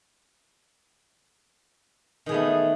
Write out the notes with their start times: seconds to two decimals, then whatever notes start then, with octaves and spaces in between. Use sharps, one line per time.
2.26 D#3
2.29 G#4
2.31 B3
2.34 A3